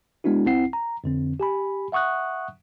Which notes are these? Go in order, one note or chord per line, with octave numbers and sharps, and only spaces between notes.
G#3 B3 D4 E4 F#4
C2 C4 E4 F#5 C7
A#5
F2 D3 C4
G4 G#5 B5
E5 F#5 C#6 D#6 F#6